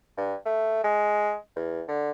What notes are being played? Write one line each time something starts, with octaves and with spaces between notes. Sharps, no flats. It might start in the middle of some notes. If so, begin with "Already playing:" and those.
G2
A3
G#3
E2
D3